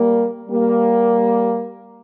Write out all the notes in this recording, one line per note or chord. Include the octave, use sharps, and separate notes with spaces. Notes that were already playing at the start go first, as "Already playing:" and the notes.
Already playing: G3 A#3
G3 A#3